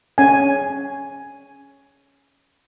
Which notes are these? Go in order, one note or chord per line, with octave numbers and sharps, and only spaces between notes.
C#4 G#5